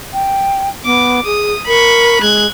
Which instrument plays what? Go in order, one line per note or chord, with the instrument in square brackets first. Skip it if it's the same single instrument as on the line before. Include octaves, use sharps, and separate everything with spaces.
[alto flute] G5
[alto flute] B3 [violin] D6
[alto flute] G#4 [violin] D#6
[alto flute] A#4 [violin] B5 C#6
[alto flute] G#3 [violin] F#6 G#6